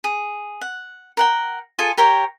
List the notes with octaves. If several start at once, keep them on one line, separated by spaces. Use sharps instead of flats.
G#4
F#5
A#4 F#5 G5
F4 G#4 A4 G#5
G4 A#4 C#5 G5